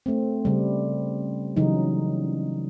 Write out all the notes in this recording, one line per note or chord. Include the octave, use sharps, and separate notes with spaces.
A3 C4
C#3 G3
C#3 E3 F#3 D#4